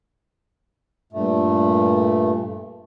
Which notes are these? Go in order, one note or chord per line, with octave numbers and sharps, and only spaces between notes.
G2 A#2 A3